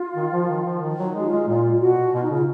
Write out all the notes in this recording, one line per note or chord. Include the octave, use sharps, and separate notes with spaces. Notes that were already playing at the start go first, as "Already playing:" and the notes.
Already playing: F4
D#3
F3
D#3
F3
D#3
F#3
D#4
G#3 F#4
F4
G#3
A#2 F4
F4
B2 F#4
B2 F4
D#4
C#3 F4